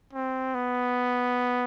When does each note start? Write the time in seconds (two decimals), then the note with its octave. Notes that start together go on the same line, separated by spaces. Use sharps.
0.13 C4
0.55 B3